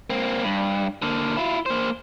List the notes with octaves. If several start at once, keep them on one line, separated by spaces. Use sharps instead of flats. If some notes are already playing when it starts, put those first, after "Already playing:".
A#3 C4
G2
D3 A#3
E4 F4
A#3 C5